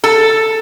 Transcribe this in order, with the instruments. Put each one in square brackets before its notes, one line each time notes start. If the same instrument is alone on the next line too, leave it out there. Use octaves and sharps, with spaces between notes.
[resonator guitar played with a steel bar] A4